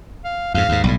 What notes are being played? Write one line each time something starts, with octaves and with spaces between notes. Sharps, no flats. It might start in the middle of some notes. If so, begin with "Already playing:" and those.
F5
F2 G#2 F5
D#2 G#2
B1 A2 G3